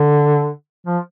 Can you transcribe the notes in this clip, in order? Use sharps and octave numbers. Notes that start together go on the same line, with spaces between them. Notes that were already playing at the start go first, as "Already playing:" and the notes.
Already playing: D3
F3